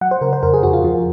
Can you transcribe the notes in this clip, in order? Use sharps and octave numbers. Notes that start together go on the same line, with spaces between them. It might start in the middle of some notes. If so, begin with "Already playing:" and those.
F#3 F#5
C5
C#3 A#4
C5
F2 A#4
G#4
F2 F#4
F4
F3